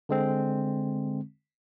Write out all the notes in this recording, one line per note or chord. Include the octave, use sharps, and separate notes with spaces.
D3 G#3 C4